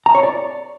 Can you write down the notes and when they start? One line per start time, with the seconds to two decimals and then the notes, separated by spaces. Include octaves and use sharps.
0.06 A#5
0.15 C#5
0.23 D5